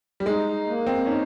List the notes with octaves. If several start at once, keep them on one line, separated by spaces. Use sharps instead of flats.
G3
G#3 D#4
A#3
C4
C#4 D#4